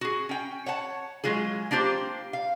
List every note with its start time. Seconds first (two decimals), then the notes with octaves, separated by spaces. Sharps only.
0.01 F#4 G#4
0.29 C#4 G5
0.66 C#5 F#5 A5
1.24 F#3 G#3 F4 G#4
1.71 A#3 D4 F4 G4 C5
2.33 F5